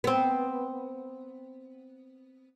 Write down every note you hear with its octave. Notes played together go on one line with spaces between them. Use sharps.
B3 C4